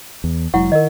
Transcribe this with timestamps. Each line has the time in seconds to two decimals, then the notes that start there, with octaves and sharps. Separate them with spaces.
0.24 E2
0.54 F1 F#3 G#3 E4 F#5 C#6
0.72 D#3 A#4 D#5